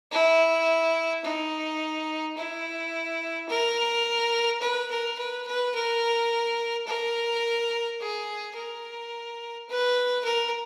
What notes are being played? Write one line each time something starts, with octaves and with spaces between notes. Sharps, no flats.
E4
D#4
E4
A#4
B4
A#4
B4
B4
A#4
A#4
G#4
A#4
B4
A#4